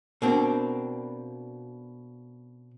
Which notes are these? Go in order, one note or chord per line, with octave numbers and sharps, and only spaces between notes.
B2 A#3 C4 D4